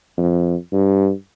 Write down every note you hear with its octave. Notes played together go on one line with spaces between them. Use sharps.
F2
G2